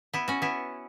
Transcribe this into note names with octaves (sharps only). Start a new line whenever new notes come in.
B3 E4
C#4 F#4
B3 E4